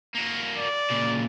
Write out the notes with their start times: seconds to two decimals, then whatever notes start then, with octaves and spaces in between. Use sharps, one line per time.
0.15 A#3 F#4
0.57 D5
0.91 A#2 C#3